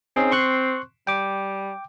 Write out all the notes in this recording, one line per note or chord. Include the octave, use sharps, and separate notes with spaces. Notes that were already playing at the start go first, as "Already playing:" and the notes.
C4 C#4 D#4 G#4
C6 C#6 F#6
G3 G5 D6